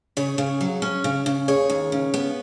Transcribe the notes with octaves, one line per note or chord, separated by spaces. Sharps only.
C#3 G#4 C#5
C#3
F#3
C#4
C#3
C#3
D#2 G#4 C#5
D#2
C#3
B3